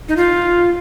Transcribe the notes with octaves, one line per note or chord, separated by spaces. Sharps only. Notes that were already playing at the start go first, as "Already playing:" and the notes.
D#4
F4